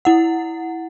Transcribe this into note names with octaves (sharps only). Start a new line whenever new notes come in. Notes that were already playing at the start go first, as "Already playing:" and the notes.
E4 F#5